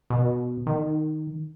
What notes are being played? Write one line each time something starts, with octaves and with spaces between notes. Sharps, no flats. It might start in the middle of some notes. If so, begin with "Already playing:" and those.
B2
D#3